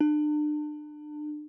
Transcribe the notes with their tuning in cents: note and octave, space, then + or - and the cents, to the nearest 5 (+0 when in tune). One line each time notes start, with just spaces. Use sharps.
D4 +35